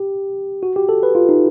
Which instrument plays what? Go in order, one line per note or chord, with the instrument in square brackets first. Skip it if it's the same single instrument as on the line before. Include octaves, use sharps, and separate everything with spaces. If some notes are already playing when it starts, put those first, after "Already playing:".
Already playing: [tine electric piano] G4
F#4
G4
A4
B4
F4
D#4